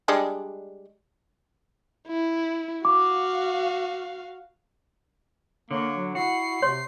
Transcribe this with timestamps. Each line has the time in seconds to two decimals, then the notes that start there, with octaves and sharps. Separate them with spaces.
0.08 G3 G#3 D4
2.08 E4
2.85 F#4 F5 D6
5.71 D3 A#3 C#5
5.95 F#3
6.15 E4 F#4 C7
6.62 C3 C#5 C6